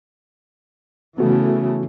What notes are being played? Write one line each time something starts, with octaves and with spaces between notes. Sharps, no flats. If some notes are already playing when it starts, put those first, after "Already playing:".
C#3 E3 A3 B3 F#4